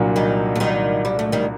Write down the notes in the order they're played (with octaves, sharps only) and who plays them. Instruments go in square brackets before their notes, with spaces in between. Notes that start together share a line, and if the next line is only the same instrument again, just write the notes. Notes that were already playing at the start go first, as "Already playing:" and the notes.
Already playing: [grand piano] C2 A#2 F#3 A#3 D4
[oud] D#3 G3
A3
D#3 G3
G3
A3
D#3 G3